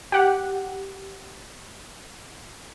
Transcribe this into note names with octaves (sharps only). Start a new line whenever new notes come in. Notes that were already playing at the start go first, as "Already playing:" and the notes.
G4 F#5